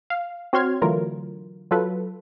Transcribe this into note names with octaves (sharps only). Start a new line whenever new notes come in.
F5
C4 F#4 C#5 C6 F6 G#6
D3 E3 F#3 A3 F4 A#4
F#3 F4 A4 B4